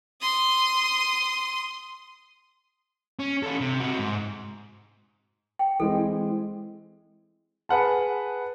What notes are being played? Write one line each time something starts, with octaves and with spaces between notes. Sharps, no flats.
C6 D#6
C#4
C#4 A4
C3
C3 F#4
G#2
G5
E3 G#3 C4 A4
G#4 B4 F#5 A5